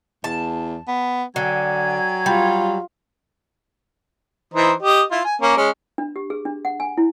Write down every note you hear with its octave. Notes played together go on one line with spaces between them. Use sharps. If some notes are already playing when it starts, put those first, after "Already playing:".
E2 A5
B3
D3 F#3 G5 G#5 G#6
G3 F4
E3 D#4 C5
G4 D#5
E4 F4
G#5
A#3 C#4
G#3 C#4
D4
G4
G#4
D4
F#5
G#5
E4